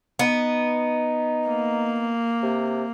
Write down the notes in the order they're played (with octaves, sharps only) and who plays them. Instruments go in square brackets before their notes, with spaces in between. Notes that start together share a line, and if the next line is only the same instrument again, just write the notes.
[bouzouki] B3 [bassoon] D#4
[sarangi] A#3
[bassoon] C3